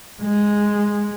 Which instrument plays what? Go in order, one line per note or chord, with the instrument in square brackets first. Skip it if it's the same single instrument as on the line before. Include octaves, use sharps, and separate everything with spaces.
[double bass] G#3